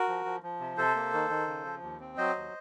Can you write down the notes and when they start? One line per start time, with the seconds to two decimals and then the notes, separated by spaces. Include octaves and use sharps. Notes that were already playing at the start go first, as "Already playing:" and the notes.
Already playing: F#4 A#4
0.08 F3
0.25 F3
0.43 F3
0.60 C3
0.77 C3 A4 C5
0.96 A#3
1.13 D#3
1.30 D#3
1.47 C#3
1.65 F3
1.82 D#2
2.00 C4
2.17 F#3 C5 D#5
2.35 D#2